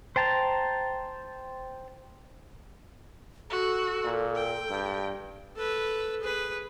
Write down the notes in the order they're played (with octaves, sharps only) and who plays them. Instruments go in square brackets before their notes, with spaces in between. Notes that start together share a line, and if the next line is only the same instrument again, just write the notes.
[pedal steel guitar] C5 G5 A5 A#5
[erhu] F#4 [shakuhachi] A4
[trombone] A#2
[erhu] G5
[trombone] G2
[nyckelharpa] A4 B4
G#4 B4